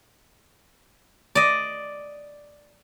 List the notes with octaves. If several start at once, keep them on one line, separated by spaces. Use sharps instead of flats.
D5 D#5